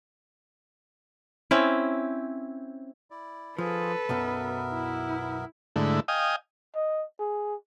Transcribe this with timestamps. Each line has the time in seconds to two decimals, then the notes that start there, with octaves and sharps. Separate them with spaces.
1.51 C4 C#4 E4
3.11 E4 D5
3.58 F3 F4 G#4 A4 B4
4.09 B1 F#2 B2 B3 A#4 E5
4.72 E4
5.76 G#2 D3 A3 E4
6.08 D#5 F5 G5 G#5 D#6
6.76 D#5
7.20 G#4